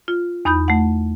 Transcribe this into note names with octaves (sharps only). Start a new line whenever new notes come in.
F4
E2 D#4 B5 D#6 G6
A3 F#5